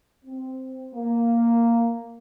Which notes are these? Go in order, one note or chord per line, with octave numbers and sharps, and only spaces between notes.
C4
A#3